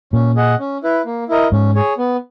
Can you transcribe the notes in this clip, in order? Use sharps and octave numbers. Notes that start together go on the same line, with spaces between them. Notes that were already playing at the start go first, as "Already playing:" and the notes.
A#2 C#4
G#4 D#5 F#5
C#4
E4 B4
A#3
E4 A#4 D#5
G#2 C#4
G#4 C#5
B3